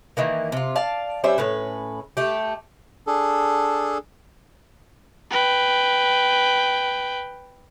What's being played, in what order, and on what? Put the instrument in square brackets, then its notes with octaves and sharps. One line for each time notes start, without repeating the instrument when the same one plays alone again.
[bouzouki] D#3 E3 A#3
C3 F4
D5 F5 A5
G3 C#4 C5 E5
A2 C#4 B4
A3 G4
[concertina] D4 G#4 A4
[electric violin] B4 G5